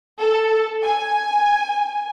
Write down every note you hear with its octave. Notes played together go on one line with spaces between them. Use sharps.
A4
G#5